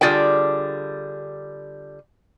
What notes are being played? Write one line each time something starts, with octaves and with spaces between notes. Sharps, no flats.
D3 G3 F4 G#4 B4 G5